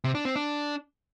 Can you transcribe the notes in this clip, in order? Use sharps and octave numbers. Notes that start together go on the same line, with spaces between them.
C3
D4
C4
D4